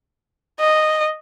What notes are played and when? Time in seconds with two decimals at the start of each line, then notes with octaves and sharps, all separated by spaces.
0.59 D#5